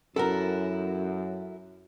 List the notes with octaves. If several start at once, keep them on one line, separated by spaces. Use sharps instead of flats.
F#2 E4 F#4 A4 A#4